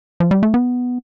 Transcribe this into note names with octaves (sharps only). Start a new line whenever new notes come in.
F3
G3
A3
B3